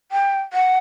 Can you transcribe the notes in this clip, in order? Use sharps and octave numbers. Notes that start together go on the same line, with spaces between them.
G5
F#5